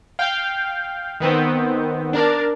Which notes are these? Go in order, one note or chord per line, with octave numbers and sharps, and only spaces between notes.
F5 G5
D#3 B3 C4
D4 A#4 D5